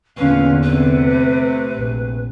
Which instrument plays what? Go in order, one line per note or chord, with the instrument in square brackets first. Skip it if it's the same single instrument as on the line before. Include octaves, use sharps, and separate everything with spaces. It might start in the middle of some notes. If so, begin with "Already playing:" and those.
[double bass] E2 D3 [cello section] A#2 C#4 F5 [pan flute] B4
[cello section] C3 A3 [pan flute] B4
[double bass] A#1